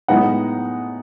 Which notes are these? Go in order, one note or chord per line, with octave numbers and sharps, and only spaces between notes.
A2 G#3 B3 D#4 F#5